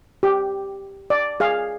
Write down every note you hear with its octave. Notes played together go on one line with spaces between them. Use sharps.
G4
D5
G#4 F5